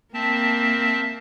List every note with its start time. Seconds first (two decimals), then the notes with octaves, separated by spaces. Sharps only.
0.14 A#3 C4 E5 A5